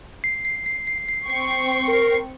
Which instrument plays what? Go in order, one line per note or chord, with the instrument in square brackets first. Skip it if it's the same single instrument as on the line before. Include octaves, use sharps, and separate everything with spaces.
[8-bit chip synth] C7
[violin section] C4 G5 C#6
[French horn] A#4